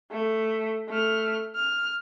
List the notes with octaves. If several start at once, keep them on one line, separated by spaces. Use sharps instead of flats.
A3
A3 F6
F6